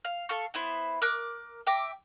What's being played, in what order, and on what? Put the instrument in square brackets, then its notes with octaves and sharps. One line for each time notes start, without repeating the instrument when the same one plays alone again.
[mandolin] F5
A4 F5 C#6
B3 E4 C5
A#4 D6 F#6
E5 G5 A#5 D6